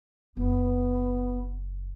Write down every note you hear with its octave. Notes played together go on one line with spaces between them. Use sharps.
F#1 B3